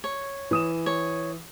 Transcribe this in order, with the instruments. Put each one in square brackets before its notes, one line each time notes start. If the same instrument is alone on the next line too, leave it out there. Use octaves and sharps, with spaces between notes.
[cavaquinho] C#5
[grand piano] E3 D#6 E7
[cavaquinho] C#5